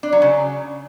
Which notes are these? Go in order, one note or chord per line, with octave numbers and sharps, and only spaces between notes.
D4
F#3
C#3